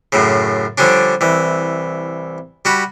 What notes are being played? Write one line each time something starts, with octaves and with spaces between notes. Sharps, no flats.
F#2 A2 C#3
D3 F3 G3 C#4 D4
C2 E3
G3 F#4 B5